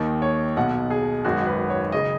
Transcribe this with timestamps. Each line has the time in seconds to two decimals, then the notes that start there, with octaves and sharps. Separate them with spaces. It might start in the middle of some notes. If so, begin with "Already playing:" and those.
Already playing: D#2 D#3
0.22 C#5
0.56 B1 B2 F#5
0.90 G#4
1.25 G#1 F#2 D#3 F#4
1.47 B4
1.70 C#5
1.92 F#1 C#3 D#5